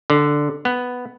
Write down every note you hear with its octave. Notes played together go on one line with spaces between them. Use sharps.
D3
B3